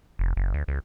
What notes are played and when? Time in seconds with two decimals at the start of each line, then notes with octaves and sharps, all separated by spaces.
0.19 F1
0.37 F#1
0.54 D2
0.68 C#2